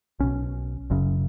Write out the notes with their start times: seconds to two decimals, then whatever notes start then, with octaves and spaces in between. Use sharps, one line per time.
0.20 B1 B2 C#4
0.90 F#1 F#2 C#3